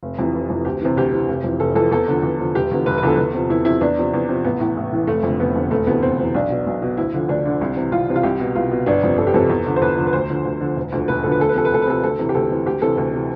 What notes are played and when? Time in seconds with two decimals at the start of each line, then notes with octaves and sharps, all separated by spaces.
0.03 F1
0.19 F2 C3 E3
0.33 F1
0.50 F2 C3 E3
0.65 D2 G4
0.81 C3 E3
0.97 D2 G4
1.13 C3 E3
1.28 F1
1.44 F2 E3
1.60 F1 A4
1.75 F2 E3 A4
1.91 E2 A4
2.08 D3 F3
2.23 E2
2.39 D3 F3
2.55 E1 G4
2.71 E2 D3 F3
2.86 E1 B4
2.98 B4
3.03 E2 D3 F3 A4
3.18 E2
3.34 C3 F3
3.50 E2 E4
3.65 C3 F3 E4
3.81 E2 D4
3.98 C3 F3
4.14 E2
4.29 C3 F3
4.44 A1 B3
4.60 A2 E3
4.76 A1
4.92 A2 E3
5.07 F1 A3
5.23 F2 D3
5.40 F1 B3
5.56 F2 D3
5.71 E1 A3
5.87 D2 C3 E3 B3
6.02 E1 C4
6.18 D2 C3 E3
6.34 B1 D4
6.50 B2
6.66 B1
6.82 B2
6.97 D2 E4
7.14 D3 F3
7.28 D2 D4
7.45 D3 F3
7.61 C2
7.77 C3 E3
7.92 C2 F4
8.09 C3 E3
8.16 F4
8.23 C2 G4
8.40 B2
8.55 C2 F4
8.71 B2
8.86 G1 D4
9.03 F2 C3
9.18 G1 A4
9.27 G4
9.34 F2 C3 A4
9.50 E2
9.66 D3 F3
9.76 C5
9.81 E2 B4
9.97 D3 F3
10.07 B4
10.13 D2 C5
10.30 D3 F3
10.45 D2
10.61 D3 F3
10.76 E1
10.92 D2 D3 F3
11.08 E1 B4
11.23 D2 D3 F3 A4
11.32 B4
11.39 D2 A4
11.49 B4
11.55 C3 F3 A4
11.65 B4
11.72 D2 A4
11.82 B4
11.87 C3 F3 A4
12.03 D2 A4
12.19 C3 E3
12.29 G4
12.35 D2 A4
12.51 C3 E3
12.66 D2 G4
12.82 C3 E3 A4
12.97 D2 A4
13.13 C3 E3